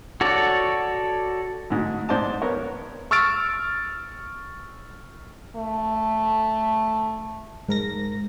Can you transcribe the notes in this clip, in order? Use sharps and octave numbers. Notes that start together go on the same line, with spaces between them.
F#4 A4 C#5 D5
D2 G#2
G#2 C5 D5 A5
B3 A#4 C#5
C#6 E6 F6 A6 D7
A3
G#2 A#4 A#6